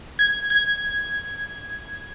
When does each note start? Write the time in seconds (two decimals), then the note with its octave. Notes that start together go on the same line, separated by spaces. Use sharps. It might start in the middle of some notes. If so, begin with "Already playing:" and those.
0.19 G#6
0.50 G#6